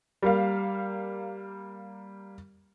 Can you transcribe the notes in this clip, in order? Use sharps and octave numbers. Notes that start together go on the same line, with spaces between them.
G3 A#3 F5